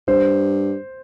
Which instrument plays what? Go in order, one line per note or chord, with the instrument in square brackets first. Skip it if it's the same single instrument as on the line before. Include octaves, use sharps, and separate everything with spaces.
[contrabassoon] G2 [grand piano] C5